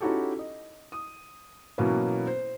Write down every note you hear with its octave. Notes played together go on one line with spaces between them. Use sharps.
C#4 D#4 E4 F#4 G4 A4
D#5
D#6
B2 E3 F#3 A#3 B3 C#4
C5